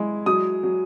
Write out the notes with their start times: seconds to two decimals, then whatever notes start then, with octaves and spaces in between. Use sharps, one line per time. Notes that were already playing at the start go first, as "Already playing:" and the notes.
Already playing: G#3 E4
0.26 F#3 D#6
0.63 F#3